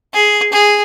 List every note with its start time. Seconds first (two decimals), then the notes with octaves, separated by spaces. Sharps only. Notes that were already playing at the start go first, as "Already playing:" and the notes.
0.14 G#4
0.52 G#4